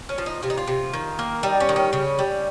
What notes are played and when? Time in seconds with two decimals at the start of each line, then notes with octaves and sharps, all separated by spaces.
0.09 C#4
0.18 F3
0.26 D#4
0.43 C3 F4
0.50 D#4
0.58 F4
0.67 C3
0.94 D#3
1.19 A#3
1.43 G3 D#4
1.60 C#4
1.69 D#3
1.76 C#4
1.93 C#3 C#4
2.19 G3